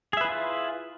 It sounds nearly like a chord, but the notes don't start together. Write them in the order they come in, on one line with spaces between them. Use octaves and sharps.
G#4 E5 B4 E4 F4